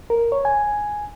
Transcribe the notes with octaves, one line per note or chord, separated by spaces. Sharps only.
A#4
C#5
G#5